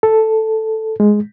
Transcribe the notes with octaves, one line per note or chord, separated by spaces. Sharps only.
A4
G#3